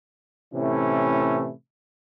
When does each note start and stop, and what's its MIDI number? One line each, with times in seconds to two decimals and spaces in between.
0.54 1.51 45
0.54 1.51 48
0.54 1.51 52
0.54 1.51 57
0.54 1.51 61
0.54 1.51 64